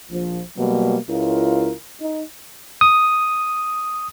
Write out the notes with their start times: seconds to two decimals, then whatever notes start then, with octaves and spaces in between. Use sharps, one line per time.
0.10 A#1 F3
0.57 B2 F#3 G3 A#3
1.10 C#2 E4 F4 A#4
2.01 D#4
2.81 D#6